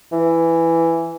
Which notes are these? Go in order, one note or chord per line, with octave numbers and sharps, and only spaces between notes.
E3